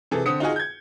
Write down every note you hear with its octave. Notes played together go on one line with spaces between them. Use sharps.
C3 E3 G#4 A4
D3 C4 D#6 C#7
D#4 F4 F#4 G#4
G6 G#6